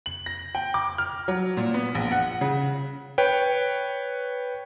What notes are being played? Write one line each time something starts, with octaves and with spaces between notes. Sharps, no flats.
F#7
A#6
G5
D6
F6
F#3
A#2
B3
A#1
F#5
C#3
B4 C#5 G5